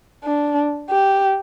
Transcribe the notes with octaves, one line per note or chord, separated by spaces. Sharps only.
D4
G4